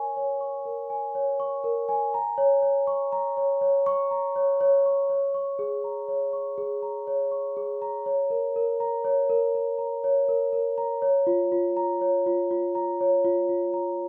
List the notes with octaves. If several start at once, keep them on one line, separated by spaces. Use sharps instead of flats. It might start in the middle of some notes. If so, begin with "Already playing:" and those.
Already playing: A#4 C#5 G#5 C#6
C#5
C#6
A#4
G#5
C#5
C#6
A#4
G#5
A#5
C#5
C#5
C#6
A#5
C#5
C#5
C#6
A#5
C#5
C#5
C#6
C#5
C#6
G#4
A#5
C#5
C#6
G#4
A#5
C#5
C#6
G#4
A#5
C#5
A#4
A#4
A#5
C#5
A#4
A#4
A#5
C#5
A#4
A#4
A#5
C#5
F4
F4
A#5
C#5
F4
F4
A#5
C#5
F4
F4
A#5